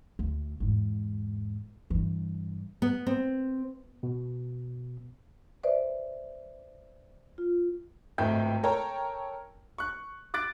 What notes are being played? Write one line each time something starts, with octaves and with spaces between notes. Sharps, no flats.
D2
E2 G#2
G2 E3
B3
C4
B2
B4 C5 D5 E5
F4
G#1 C#2 A2 A3 G5 G6
A4 A#4 C#5 G5 A5 A#5
C#6 F#6
D6 F#6 A6 D7